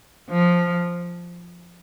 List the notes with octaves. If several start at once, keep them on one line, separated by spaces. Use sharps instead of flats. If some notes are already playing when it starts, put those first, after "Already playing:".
F3